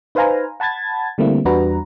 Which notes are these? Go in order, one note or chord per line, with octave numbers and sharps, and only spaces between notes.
D#4 B4 C5 F5 G#5 A#5
F#5 A5 B5 G#6 A6
D3 G3 A3 A#3 C4 E4
E2 G3 D4 F#4 B4 A#5